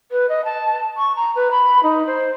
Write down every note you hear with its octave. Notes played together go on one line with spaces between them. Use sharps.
B4
D#5
A5
C#6
A#5
B4
B5
D#4
C5